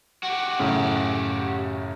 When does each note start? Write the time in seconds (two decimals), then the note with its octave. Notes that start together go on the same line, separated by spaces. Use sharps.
0.23 F#4 G4
0.59 F#2 A2 C#3